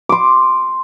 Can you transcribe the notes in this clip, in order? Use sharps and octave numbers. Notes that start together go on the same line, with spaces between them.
C6 D6